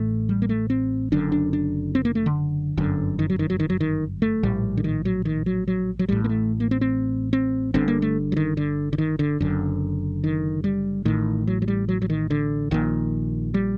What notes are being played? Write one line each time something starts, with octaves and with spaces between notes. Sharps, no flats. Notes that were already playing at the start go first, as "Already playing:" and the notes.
Already playing: A1 A2 A3
G3
A#3
A3
C4
F#1 F#2 D3 D4
D4
D4
C4
A#3
A3
D3
G1 F#2 D3
D#3
F#3
D#3
F#3
D#3
F#3
D#3
A3
A#1 A2 G3
D3
D#3
F#3
D#3
F#3
F#3
F#3
A1 A2 G3
A#3
A3
A#3
C4
C4
C4
G1 G2 D3 C4
A#3
A3
F#3
D#3
D3
D3
D#3
D3
F#1 F#2 D3
D#3
G3
A1 A2 D#3
F#3
F#3
G3
F#3
F#3
D#3
D3
A#1 A#2 D#3
G3